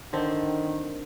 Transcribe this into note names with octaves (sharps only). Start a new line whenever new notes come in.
D3 D#3 C4